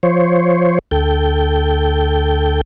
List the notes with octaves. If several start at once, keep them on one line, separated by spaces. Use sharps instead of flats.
F3 C5 C#5
D2 A4 G5